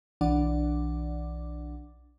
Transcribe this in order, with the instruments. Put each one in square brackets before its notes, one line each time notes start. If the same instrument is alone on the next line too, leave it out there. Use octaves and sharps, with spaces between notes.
[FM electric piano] B1 E3 D4 D5 F#5 D6